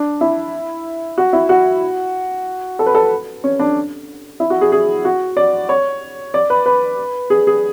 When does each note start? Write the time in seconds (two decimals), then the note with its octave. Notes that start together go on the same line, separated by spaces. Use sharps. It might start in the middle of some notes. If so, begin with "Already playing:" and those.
Already playing: D4
0.21 E4
1.18 F#4
1.33 E4
1.49 F#4
2.79 A4
2.86 B4
2.95 A4
3.44 C#4
3.59 D4
4.40 E4
4.50 F#4
4.61 G#4
4.72 G#4
5.05 F#4
5.37 D5
5.69 C#5
6.34 D5
6.50 B4
6.66 B4
7.30 G#4
7.47 G#4